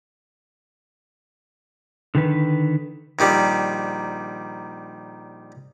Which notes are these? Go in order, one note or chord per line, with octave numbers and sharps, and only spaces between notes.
D3 D#3 B4
A#1 D#3 G3